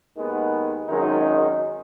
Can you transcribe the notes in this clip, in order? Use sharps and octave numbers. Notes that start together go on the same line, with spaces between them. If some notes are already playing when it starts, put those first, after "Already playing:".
D#2 D#3 G#3 B3
G#1 F#2 D#3 G#3 D#4